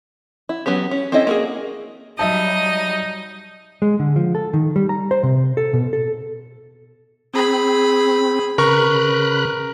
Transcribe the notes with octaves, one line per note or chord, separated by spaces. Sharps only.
E4
F#3 B3 C#4 G4
C#4
C4 C#4 E4 A4 D#5
A#3 F#4 G#4
F#3 G3 D#4 D#5 E5 A5
G#3
D3
F3
A4
D#3
G3
A#5
C5
C3
A4
B2
A4
C4 G#4 B5
C#3 A#4 B4 B5 C#6 F#6